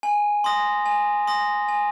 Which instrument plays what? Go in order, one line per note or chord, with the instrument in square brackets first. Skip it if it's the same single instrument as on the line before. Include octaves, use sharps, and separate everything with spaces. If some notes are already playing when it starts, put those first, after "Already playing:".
[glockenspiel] G#5
C6 D#6 A#6
G#5
C6 D#6 A#6
G#5